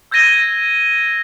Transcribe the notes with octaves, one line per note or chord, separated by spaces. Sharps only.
E6 G6 G#6 A#6 D#7 G7